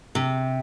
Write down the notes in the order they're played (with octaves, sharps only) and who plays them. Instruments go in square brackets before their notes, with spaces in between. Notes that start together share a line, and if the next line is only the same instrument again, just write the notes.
[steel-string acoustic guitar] C3